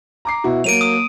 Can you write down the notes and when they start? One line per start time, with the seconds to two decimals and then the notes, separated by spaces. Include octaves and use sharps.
0.25 A#5 D6 C7
0.44 B2 E4 F#4
0.64 F#3 A#3 D7 D#7 F7
0.81 D#6